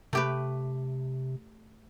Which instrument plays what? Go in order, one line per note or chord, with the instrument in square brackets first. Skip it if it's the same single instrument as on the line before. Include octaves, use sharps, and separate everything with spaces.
[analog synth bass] C3 [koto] A3 G4 B4